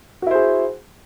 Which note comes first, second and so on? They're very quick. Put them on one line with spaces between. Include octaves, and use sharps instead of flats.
F#4 E4 C5 G#4